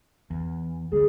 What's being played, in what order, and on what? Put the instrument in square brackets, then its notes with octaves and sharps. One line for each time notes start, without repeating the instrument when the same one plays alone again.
[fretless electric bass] E2
[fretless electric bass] D2 G3 [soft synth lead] G#4